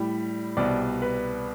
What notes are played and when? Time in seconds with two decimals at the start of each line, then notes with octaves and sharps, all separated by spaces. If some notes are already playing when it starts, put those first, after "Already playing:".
Already playing: A2 G3
0.57 C2 B2 G3 D5
1.02 B4